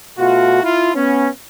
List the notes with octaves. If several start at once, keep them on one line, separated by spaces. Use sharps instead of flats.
B2 A3 F4 F#4
E4 F4
B3 C#4